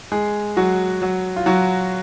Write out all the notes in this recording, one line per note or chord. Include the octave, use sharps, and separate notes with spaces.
G#3 G#4
F#3 F#4
F#3 F#4
F4
F#3 F#4